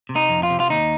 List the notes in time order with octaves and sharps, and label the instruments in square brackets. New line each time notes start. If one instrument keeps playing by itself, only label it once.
[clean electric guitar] C3
D#4
F2
F4
C3
F4
D#2 D#4